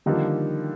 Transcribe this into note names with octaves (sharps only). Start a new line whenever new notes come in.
D3 D#3 F3 G3 A#3 D#4